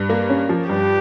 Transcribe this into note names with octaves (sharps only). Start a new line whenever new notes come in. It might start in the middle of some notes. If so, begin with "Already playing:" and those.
Already playing: G2
A#3
C#4
F3
G2 G4